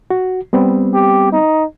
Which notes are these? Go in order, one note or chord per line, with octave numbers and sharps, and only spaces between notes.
F#4
G3 B3 C4
G4
D#4